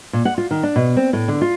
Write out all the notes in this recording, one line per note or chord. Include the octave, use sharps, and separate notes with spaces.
A#2
F#5
F4
D#3
D4
B2
C4
A2
D3
F4